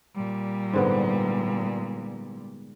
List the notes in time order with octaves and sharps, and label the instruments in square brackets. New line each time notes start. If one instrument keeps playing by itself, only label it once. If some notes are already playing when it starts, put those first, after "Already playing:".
[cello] A#2 G3
[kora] G#2 D3 B3